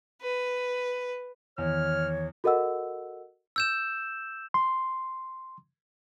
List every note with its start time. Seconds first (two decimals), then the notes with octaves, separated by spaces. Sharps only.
0.22 B4
1.58 E2 D#3 C#5 F6
2.44 F#4 A4 A#4 D#5 F#5 E6
3.56 E6 G6 E7
4.54 C6